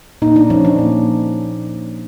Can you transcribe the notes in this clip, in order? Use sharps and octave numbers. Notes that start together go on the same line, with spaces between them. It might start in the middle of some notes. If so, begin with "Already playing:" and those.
A#2 D#4
D4
F3 A#3 C#4
D4
A#2